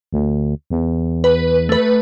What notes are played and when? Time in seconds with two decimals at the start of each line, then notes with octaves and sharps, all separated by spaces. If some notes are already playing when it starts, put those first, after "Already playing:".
0.13 D2
0.70 E2
1.24 B4
1.69 A3 B4